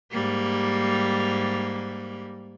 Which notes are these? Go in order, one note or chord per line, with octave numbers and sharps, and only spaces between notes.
G#2 G3 A#3